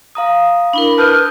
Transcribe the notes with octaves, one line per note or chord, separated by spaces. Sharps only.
F5 A#5 D#6
D4 E4 A#4 B5
B4 A5 D#6 F6 G6